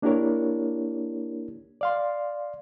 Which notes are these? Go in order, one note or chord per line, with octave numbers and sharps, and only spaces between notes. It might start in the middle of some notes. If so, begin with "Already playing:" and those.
A#3 D4 E4 G4 A#4 C#5
D5 F5 C6